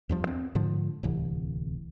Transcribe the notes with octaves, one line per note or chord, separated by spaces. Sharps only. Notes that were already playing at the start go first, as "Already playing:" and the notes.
E2 G2 F3
C4
G#2 D3 F3
D1 C2 E3